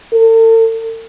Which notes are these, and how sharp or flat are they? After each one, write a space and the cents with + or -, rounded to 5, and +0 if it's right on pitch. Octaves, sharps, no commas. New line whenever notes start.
A4 +45